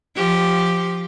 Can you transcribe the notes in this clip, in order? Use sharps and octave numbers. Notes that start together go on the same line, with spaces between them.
F3 G4